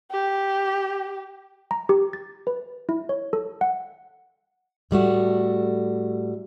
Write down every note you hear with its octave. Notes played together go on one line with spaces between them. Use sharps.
G4
A#5
G4
A6
B4
E4
C#5
A4
F#5
A2 G3 A3 F#4